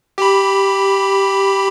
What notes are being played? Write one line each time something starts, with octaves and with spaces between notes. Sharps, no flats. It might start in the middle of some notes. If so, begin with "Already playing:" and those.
G4 B5